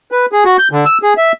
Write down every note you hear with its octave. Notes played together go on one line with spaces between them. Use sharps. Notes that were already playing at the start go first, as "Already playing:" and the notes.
B4
G#4
F#4
G6
D3
E6
G#4
E5